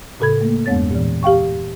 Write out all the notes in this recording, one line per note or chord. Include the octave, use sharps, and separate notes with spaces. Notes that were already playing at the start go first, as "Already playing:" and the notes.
A2 C#3 A4 B5 G#6
A3 A#3
E2 G2 G#3 B3 C#5 A6
A#2 E3
G4 F5 G5 C#6